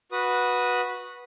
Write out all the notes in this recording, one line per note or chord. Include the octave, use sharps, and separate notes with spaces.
F#4 B4 D#6